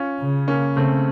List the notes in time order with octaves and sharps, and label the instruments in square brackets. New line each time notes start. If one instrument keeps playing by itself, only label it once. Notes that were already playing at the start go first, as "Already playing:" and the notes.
Already playing: [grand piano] C#4 F4
[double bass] C#3
[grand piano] A#3 C#4
[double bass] C#3 [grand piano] A3 C4